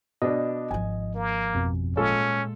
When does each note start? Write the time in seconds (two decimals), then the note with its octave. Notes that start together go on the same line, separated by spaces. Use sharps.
0.22 B2 D4 D#5
0.71 G#1 F3 G#5
1.15 A#3
1.54 F2 B2
1.97 A#2 G#3 C#4 F4 A4